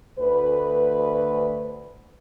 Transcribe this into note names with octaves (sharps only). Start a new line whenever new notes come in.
D2 B4